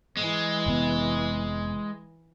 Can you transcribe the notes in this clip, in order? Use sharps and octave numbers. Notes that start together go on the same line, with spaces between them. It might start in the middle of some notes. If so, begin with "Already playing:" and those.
E3 G#3
F1 C3 B3